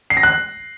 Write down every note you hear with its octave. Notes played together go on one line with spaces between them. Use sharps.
C7
A#6
F#6